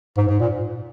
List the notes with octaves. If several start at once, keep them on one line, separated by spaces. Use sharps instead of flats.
G#2
G#2
A#2